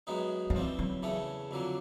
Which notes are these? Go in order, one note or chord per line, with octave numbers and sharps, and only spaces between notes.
F#2 D#3 G#3 B3 D#4
F#3
E3 F3 G3 C4
F#3
E2 C#3 E3 A3 C#4
F2 D3 F#3 A#3